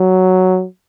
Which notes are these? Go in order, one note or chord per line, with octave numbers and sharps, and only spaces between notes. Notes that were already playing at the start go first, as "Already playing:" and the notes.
Already playing: F#3